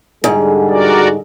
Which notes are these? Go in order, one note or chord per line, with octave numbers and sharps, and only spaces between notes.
G#2 D3 G3 G#4
F#4 A#4 D5